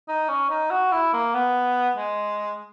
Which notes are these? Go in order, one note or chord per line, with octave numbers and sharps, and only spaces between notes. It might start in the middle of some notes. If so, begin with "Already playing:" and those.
D#4
C#4
D#4
F#4
E4
A#3
B3
G#3